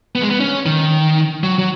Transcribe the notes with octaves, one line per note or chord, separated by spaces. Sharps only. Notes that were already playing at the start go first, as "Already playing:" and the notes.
B3
G#3
B3
C#4
D#3
F#3
F#3